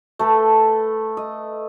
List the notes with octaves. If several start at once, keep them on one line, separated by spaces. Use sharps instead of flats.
A3 A4 B4
D#5